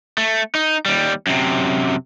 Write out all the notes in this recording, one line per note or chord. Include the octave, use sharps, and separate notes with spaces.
A3
D#4
D#2 G3
F#2 C3